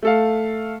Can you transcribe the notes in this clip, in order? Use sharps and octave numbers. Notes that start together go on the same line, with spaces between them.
A3 A4 F5